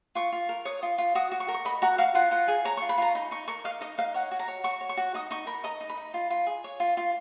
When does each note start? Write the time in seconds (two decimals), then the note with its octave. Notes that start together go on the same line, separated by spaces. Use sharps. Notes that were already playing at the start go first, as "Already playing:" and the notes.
0.15 F4 C#6
0.32 F4
0.49 A#4
0.65 C#5 D#6
0.83 F4
0.98 F4
1.15 F#4 D#6
1.32 F#4
1.40 C#6
1.48 A#4
1.54 C#6
1.65 D#5 B5
1.82 F#4 A#5
1.98 F#4 F5
2.15 F4 F#5
2.31 F4 F#5
2.48 G#4 G#5
2.65 C#5 A#5
2.77 C#6
2.82 F4
2.89 B5
2.98 F4 A#5
3.15 D#4 B5
3.31 D#4 C#6
3.48 A#4 C#6
3.64 D#5 F5
3.81 D#4 D#5
3.98 D#4 F5
4.14 C#5 F#5
4.31 F#4
4.39 A#5
4.48 C#5
4.64 F#4 C#6
4.81 C#5
4.89 C#6
4.97 F#4
5.14 D#4 D#6
5.31 D#4 C#6
5.47 A#4 B5
5.64 D#5 A#5
5.80 D#4
5.89 B5
5.97 D#4
6.14 F4
6.30 F4
6.47 G#4
6.64 C#5
6.80 F4
6.97 F4